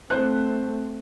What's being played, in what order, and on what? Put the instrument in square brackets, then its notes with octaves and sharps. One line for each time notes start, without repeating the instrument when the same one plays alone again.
[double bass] A3 C4 [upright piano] C5 F#6